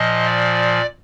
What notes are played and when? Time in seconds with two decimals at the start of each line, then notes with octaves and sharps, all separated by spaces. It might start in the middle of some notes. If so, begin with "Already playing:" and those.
Already playing: A#2 F3 D#5
0.25 D5